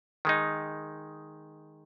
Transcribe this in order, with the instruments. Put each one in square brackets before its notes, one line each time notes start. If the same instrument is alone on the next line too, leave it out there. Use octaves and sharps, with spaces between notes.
[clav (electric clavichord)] D#3 G#3 D#4